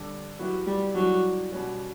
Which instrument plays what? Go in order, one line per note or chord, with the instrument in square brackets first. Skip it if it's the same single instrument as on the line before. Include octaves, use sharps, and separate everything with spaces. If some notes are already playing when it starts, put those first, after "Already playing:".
Already playing: [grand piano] D3 G3 D4 A4
[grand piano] E3 B3 E4 G4 [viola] F#3
[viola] G3
[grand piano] E3 G3 D4 [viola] F#3
[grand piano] B2 G3 C#4 F#4